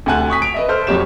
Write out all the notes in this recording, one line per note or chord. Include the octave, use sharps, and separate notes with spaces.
D2 C3 F#5 G#5 A5 F#6
C#6 D#6 B6
D7 F7
B4 D#5 E5
A4 C5 F6
C2 F2 F#3 G4 C#5 E7